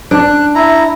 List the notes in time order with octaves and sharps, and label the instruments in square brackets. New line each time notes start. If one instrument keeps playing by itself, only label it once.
[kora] D4 [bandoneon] F#6
[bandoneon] E4 A#5